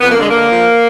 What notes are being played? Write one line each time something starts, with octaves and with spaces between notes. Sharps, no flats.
F2 B3
A#3
D3 G#3
D3 A#3
F3